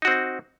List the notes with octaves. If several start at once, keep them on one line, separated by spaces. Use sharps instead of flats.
C4 D#4 F#4